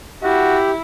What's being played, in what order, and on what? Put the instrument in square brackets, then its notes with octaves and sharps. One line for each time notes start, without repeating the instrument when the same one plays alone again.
[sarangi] E4 [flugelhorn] F#4 [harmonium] G4